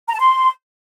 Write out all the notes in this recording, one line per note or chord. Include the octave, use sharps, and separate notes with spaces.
A#5
A5
C6